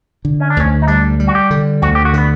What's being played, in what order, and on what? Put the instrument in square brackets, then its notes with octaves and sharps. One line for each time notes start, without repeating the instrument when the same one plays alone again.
[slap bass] D3
[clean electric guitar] C#4
D4
[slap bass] D2 [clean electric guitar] C#4
[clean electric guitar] D#4
[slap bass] G3 [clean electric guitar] D4
[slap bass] G3
[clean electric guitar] F#4
G4
[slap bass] D3
[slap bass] D2 [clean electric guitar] F#4
[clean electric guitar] G4
F#4
[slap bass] D3 [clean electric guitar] B3